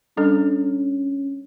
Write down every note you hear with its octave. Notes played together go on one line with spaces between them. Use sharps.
G3 C#4 D4 A4